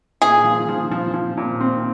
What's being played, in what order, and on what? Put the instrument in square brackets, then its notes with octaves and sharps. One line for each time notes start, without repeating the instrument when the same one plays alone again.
[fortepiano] A#2 [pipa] G#4
[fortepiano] F3
F3
F3
F3
A#2
C4